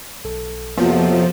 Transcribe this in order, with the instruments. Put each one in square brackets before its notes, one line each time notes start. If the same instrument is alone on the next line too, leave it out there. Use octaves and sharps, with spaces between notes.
[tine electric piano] B1 A4
[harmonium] F2 C3 F#3 [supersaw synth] F3 [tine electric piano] A#3 [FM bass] B3